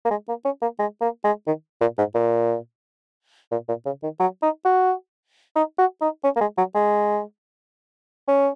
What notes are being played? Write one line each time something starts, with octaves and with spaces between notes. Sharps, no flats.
A#3
G#3
A#3
C#4
A#3
G#3
A#3
G#3
D#3
A#2
G#2
A#2
A#2
A#2
C#3
D#3
F#3
D#4
F#4
D#4
F#4
D#4
C#4
A#3
G#3
F#3
G#3
C#4